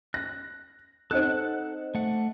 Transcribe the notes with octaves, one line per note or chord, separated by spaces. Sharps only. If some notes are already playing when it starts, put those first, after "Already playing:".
F#6 A#6
C4 D#4 A4 F#5 F#6
A3 F#5